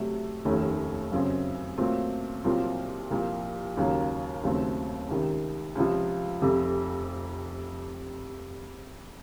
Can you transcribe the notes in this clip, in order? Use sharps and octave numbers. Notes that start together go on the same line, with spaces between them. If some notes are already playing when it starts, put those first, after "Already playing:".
Already playing: C3 F#3 A3
F1 D#2 D#3 A3 C#4
F#2 C#3 F#3 C4
A#2 F#3 A3 C4
C2 A#2 F#3 C4 F4
C2 A#2 F3
D#2 C#3 F#3 A#3
D#2 C#3 F#3 A3 C4
C#2 C3 D#3
C#2 C3 F3
F1 F2 C3